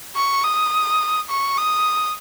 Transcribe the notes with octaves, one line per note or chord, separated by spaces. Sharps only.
C#6
D#6
C#6
D#6